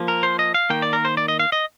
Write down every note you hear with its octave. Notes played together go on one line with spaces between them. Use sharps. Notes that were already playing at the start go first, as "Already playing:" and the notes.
Already playing: F3 A#3
A#4
C5
D#5
F5
D#3 A#3 G5
D5
A#4
C5
D5
D#5
F5
D#5